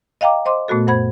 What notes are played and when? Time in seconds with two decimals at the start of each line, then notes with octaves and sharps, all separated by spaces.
0.21 D#5 F5 G5 A#5 D6
0.45 C5 D#5 C6 D6
0.68 A#2 A3 B3 F#4 A4
0.87 F#2 C5 F#5 B5 G#6